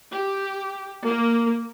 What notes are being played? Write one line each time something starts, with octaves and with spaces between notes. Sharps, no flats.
G4
A#3